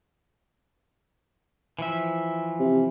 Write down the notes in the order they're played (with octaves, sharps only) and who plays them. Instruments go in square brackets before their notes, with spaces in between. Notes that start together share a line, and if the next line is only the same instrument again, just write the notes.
[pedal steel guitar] E3 F3 E5
[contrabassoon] C3